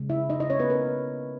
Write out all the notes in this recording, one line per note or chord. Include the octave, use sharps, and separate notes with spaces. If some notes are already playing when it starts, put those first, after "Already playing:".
Already playing: C#3 G#3
E4 E5
D#4 D#5
D#4 D#5
C#4 C#5
B3 B4
A#3 A#4